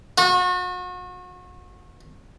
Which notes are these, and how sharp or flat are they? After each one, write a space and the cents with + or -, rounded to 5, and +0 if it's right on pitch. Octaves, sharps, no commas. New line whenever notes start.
F#4 -35